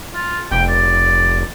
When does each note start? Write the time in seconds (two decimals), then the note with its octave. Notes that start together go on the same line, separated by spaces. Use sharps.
0.15 F4
0.51 F1 G5
0.69 D5